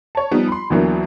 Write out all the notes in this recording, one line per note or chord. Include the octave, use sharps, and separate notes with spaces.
C#5 A5
F3 G3 B3 D#4
B5 C6
D2 D3 E3 F#3 A#3 B3